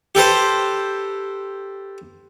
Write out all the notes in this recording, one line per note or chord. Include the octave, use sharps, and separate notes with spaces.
G4 A4 B4 C5